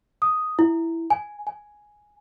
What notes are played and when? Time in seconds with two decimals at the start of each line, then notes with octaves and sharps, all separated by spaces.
0.22 D#6
0.59 E4
1.10 G#5
1.47 G#5